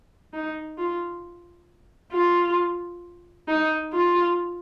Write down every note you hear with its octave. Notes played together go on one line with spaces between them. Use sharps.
D#4
F4
F4
D#4
F4